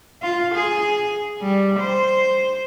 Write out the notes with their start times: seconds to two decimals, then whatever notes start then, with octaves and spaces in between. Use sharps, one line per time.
0.23 F4
0.55 G#4
1.42 G3
1.80 C5